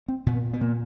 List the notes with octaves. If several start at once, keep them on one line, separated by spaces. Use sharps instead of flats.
C4
A#2 B3
B3
A#2 A#3